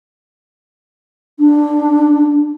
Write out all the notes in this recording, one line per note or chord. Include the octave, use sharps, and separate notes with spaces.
D4